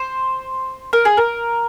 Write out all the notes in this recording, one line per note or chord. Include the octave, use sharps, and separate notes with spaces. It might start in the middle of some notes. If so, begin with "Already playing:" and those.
Already playing: C5
A#4
G#4
A#4